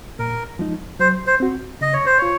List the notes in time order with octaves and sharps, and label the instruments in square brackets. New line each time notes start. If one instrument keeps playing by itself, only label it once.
[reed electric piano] A#2 [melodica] A#4
[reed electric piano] F3 G#3 D#4
[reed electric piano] F#3 [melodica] C5
[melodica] C5
[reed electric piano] C4 F#4
[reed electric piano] C#3 [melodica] D#5
[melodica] C#5
C5
[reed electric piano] F4 [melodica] C#5